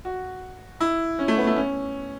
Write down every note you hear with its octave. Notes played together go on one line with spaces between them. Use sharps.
F#4
E4
C#4
A3
B3
A3
C#4